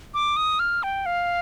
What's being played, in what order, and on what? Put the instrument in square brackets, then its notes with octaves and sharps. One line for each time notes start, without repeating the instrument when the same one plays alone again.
[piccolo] D6
D#6
F6
G5
F5